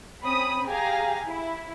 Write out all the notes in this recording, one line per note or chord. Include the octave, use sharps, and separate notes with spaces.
C4 C#4 B5 D#6
G4 G#4 F5 G#5 A#5
E4